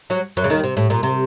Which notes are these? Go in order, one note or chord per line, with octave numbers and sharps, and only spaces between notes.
F#3 F#4
F#2 F#3
C#3
D#2 D#3
C3
A2
A#2
C3